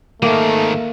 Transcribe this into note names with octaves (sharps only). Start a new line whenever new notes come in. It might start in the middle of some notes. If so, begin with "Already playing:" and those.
G#2 D#3 A3 A#3